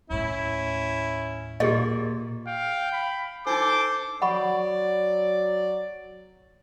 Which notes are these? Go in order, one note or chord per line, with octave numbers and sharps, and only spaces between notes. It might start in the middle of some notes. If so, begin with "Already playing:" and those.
D#2 A2 C#4 E4
A#2 G4 G#4 D#5
F5 G5
B5
D4 D#4 A4 C5 D6
F#3 D5 F#5 B5 C#6